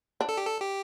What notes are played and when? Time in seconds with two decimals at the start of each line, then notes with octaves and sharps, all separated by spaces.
0.21 D4
0.29 A4
0.37 G4
0.46 A4
0.61 G4